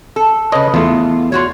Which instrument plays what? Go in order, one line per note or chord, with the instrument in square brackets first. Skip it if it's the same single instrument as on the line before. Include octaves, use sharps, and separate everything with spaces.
[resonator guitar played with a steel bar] A4
[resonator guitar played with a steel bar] C#3 B4 [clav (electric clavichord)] C#5 D#5
[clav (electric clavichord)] E2 A3 [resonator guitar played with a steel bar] F4
[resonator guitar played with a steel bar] F4 F#4 C#5